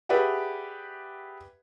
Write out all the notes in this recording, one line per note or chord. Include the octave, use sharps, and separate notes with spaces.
G4 G#4 B4 D5 E5 F#5